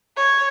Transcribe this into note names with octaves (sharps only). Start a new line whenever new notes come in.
C#5